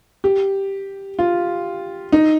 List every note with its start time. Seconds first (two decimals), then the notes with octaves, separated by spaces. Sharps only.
0.24 G4
1.19 F4
2.13 D#4